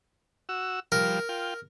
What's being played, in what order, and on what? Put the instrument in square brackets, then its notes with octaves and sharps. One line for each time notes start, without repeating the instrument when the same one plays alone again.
[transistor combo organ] F#4 E6
[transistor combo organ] F3 G3 [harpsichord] A#4
[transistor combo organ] F4 G5